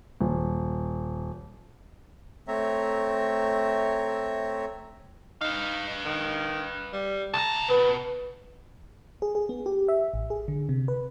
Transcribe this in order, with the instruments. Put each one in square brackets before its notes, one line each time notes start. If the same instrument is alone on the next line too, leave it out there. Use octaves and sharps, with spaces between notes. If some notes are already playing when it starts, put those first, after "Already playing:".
[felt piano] D#1
[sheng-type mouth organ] A3 C4 C#5 E5 A#5
[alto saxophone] D#4 [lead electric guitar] B4 F5
[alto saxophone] D#3
G3
[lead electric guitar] C2 A#5 [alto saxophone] A5
[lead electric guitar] B2 [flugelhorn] B4
[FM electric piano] G#4
G#4
B3
G4
E5
A1
G#4
D3
C3
B4